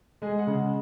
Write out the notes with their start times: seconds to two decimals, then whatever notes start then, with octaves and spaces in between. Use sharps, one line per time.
0.22 G#3 G#4
0.38 F#5
0.47 C#3